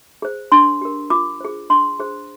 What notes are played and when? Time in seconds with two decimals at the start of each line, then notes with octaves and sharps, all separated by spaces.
0.22 G#4 C5
0.52 D4 C6
0.81 G4 A#4
1.10 F4 D6
1.40 G#4 C5
1.70 D4 C6
2.00 G#4 C5